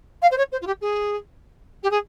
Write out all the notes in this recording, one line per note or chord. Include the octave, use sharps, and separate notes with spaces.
F5
C5
C#5
C5
F4
G4
G#4
G4
G#4